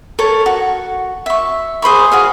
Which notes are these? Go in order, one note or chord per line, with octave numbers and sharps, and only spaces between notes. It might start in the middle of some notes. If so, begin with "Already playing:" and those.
A4 A#4 C#5
F#4
E5 C#6
G#4 C5 B5 C#6
F#4 G#4 F5